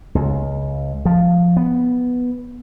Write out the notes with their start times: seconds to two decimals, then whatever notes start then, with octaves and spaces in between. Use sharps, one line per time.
0.15 C#2
1.05 F3
1.57 B3